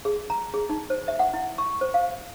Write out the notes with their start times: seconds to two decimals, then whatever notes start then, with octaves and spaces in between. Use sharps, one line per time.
0.05 G#4
0.30 A#5
0.54 G#4
0.69 D#4
0.90 C5
1.08 E5
1.19 F#5
1.34 E4
1.58 C#6
1.81 C5
1.94 F5